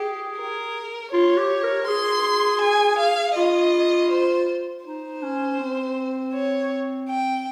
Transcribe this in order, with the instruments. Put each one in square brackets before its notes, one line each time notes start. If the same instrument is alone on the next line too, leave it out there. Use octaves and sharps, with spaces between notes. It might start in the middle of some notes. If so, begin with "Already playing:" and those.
Already playing: [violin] G4 [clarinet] G#4
[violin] A#4
[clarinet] F4 [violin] C#5
[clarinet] G4
A#4
[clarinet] G#4 [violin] C6
[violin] G#5
F5
[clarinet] F4 [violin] D#5
[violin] C5
[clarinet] D#4 [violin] C5
[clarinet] C#4
C4
[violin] C#5
G5